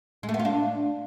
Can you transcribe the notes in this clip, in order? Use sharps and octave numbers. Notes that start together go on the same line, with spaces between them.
G#3
A3
B3
F4
D4